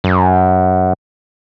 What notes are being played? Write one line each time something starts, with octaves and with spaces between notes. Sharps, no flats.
F#2